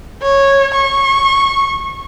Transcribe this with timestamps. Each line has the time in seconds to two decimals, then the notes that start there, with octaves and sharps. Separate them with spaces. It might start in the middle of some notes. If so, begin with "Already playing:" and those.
0.23 C#5
0.74 C#6